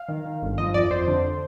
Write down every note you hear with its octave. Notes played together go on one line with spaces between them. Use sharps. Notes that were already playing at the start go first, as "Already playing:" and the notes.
Already playing: F5
D#3
D#3
G1
F3 D#5
F2 D5
F2 C5
D3